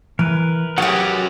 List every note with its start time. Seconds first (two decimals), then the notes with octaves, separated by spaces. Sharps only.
0.19 E3 A#4 B4
0.78 F#2 F#3 G4 G#4 F#5